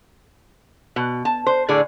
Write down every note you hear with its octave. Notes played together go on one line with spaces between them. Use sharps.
B2
A5
C5
A2 D3 G#4 D5